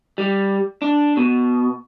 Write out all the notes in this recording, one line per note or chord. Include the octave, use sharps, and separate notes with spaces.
G3
D4
B2